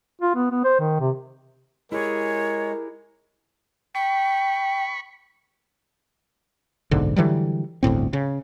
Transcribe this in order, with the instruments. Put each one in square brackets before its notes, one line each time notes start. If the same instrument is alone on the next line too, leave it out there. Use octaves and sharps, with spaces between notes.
[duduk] F4
B3
B3
C5
D#3
C3
[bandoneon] G#3 [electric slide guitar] E4 G4 G#4 [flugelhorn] A#4 [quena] C#5
[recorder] G5 [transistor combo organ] B5 C#6
[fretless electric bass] F#1 B1 G#2 D3
D3 E3 F#3 G3
G1 D2 A2 C4
C#3